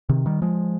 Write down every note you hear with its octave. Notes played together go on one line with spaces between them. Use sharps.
C3 D#3
D#3 G3
F3 G#3